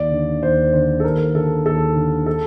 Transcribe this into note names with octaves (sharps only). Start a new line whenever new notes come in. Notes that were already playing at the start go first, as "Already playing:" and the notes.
Already playing: D#2 D5
D3
D#2 C5
D3 C5
A4
D#2 A#4
D3 A4
D#2 A4
D3
A4